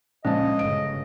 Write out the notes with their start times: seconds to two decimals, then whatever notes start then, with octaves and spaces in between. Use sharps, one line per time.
0.25 A#1 C#3 G#3 D#5 A5
0.59 G1 C#3 D7